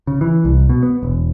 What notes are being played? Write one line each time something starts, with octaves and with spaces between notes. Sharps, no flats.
C#3
E3
C2
B2
B3
E1